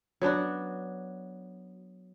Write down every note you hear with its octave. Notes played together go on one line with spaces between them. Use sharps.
F#3 B3 D4 F#4